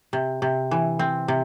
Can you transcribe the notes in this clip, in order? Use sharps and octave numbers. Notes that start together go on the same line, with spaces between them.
C3
C3
E3
C4
C3